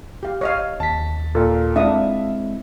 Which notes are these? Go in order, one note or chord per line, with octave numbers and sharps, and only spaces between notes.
G4 F5
C#5 D#5 F5
D#2 A5 B6
A#2 A4
G#3 C4 D4 E4 E5 F5 D#6